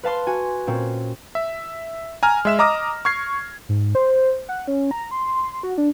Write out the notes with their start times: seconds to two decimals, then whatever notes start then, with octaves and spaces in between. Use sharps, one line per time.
0.04 B4 F5 A5 C6
0.27 F#4 G#5
0.67 A#2 C4 C#4
1.35 E5
2.23 G#5 A#5 F6
2.45 G#3 E5 E7
2.59 D#5 A#5 D6 D#6 F6 A#6
3.05 C#6 F6 G#6 C7
3.69 G#2
3.95 C5
4.49 F#5
4.68 C#4
4.91 A#5
5.11 C6
5.63 F#4
5.78 D4